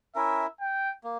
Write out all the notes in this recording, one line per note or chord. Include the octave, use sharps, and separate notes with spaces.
C#4 E4 A#4 E5
G5
A#3